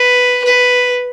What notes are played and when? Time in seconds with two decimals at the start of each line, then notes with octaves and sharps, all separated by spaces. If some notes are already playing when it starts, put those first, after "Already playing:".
Already playing: B4
0.44 B4